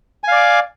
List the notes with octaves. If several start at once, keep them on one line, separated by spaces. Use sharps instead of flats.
D5 F5 G#5 D6